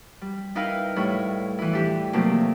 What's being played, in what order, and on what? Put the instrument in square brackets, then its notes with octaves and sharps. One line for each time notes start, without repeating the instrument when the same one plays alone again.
[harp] G3
D#4 E4 A#4 B4 F5 G5
A2 G3 E4 C#5
E3 E4
D4 G4
C3 F3 F#3 A3 A#3